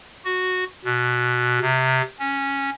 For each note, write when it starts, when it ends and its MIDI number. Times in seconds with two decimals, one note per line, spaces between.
0.25 0.64 66
0.85 1.59 47
1.61 2.02 48
2.19 2.70 61